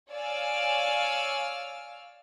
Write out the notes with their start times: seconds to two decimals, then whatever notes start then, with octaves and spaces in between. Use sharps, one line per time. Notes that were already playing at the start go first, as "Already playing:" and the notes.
0.11 C#5 D5 F5 G#5 E6 F6